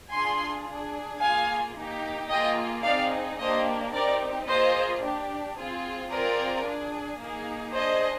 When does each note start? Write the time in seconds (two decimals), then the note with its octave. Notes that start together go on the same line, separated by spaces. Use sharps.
0.11 D4 F4 G#4 G#5 C6
0.66 D4 G#4
1.20 A#3 F4 G#4 F5 G#5
1.75 A#3 D#4 G4
2.29 A#3 F4 G#4 D#5 G5
2.83 C4 D#4 G#4 D5 F5
3.38 A#3 D4 G4 C5 D#5
3.92 C4 D#4 G4 A#4 D5
4.47 A#3 F4 G#4 C5 D#5
5.02 D4 G4
5.56 C4 F4 G#4
6.10 C4 F4 G#4 A#4 D5
6.65 D4 G#4
7.19 A#3 D#4 G#4
7.74 D4 G#4 C5 D#5